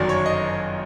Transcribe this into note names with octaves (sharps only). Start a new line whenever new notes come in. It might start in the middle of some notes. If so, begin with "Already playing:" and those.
Already playing: G1 F#2 D#3 F#3 D5
C#5
D#5